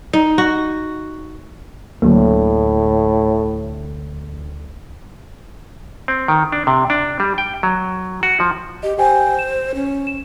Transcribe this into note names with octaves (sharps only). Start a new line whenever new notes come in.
D#4
F#4
D2 A2 D3 F#3 A#3
C4
D#3
D4
C3
D4
G3
G5
F#3
F#4
F3
G4 D#5
G4 C5 G5 G#5
E7
C#4
E7